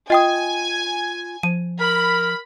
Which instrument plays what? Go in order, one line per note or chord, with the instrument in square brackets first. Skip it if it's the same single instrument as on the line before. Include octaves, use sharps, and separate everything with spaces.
[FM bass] F4 [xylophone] D#5 G5 D#6 [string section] G#5
[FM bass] F3 [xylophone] D#7
[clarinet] A#4 [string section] B5